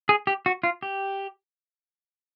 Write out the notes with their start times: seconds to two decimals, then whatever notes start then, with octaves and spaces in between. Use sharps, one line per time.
0.09 G#4
0.27 G4
0.46 F#4
0.63 F4
0.83 G4